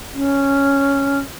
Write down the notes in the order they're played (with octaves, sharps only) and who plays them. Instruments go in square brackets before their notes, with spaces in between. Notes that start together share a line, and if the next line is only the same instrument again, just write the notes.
[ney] C#4